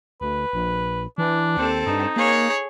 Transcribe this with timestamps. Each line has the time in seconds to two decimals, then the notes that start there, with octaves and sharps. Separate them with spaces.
0.21 D2 B4
0.53 A#1
1.18 E3 D4
1.57 D#2 C4 A4
1.87 G2 D#4
2.16 A#3 G#4 C#5